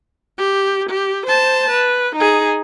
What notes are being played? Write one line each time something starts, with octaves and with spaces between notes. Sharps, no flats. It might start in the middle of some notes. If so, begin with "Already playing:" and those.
G4
G4
C5 A5
B4
D#4 G#4